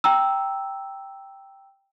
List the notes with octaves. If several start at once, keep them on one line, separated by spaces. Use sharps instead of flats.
G5 A#5 E6